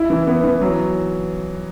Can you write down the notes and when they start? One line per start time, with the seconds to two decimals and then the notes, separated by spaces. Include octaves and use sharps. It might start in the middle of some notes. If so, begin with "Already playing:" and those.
Already playing: E4
0.10 E3
0.27 B3
0.44 E3
0.62 F#3